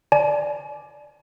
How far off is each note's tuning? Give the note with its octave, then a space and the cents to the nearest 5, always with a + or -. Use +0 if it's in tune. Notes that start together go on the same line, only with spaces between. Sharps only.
D5 +0 G#5 +40